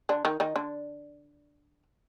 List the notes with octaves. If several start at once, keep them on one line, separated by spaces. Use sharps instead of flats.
D3 D4
D#3 D#4
D#3 D#4
D3 D4